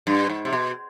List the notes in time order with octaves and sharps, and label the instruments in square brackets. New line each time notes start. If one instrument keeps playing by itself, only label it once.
[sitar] G2
G#2
C3
B2